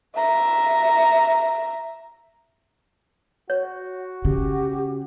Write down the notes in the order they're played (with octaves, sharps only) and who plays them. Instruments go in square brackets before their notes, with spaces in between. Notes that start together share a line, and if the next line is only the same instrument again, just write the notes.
[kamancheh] E5 A#5
[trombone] F#4 [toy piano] C#5
[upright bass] C#3 [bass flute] G4